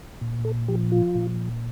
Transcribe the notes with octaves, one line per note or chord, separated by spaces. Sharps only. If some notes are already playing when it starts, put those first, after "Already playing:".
A#2
A4
F3 G4
F4
A#2